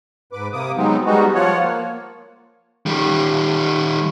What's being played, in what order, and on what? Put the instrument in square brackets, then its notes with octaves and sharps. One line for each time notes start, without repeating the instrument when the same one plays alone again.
[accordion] G#2 B4 D6
C3 A#3 D6 D#6
F#3 G#3 B3 C4 D#4
G3 G#3 B3 D#4 F#4
F3 F4 C#5 F#5
A#3
[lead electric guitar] D#3 G3